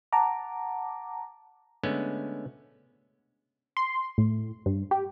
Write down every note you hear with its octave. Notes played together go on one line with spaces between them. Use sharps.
F#5 A5 A#5 D6
D3 G#3 A3 B3 C#4
C6
A2
G2
G4